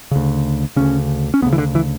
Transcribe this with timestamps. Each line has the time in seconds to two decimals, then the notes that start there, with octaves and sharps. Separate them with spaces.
0.11 D2 C#3
0.76 D2 C#3 C#4
1.34 C#4
1.42 D2 B3
1.46 C#3
1.53 E3
1.58 D3
1.75 E3